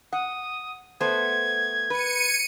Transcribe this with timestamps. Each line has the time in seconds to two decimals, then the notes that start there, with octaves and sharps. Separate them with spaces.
0.13 F#5 D#6
1.01 A3 B3 C5 G#6
1.90 B4 C#7 D#7